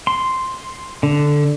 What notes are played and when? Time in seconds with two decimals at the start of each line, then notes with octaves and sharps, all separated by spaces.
0.07 C6
1.03 D3